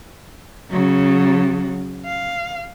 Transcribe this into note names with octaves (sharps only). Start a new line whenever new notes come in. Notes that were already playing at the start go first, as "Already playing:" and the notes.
C#3 F#3
F5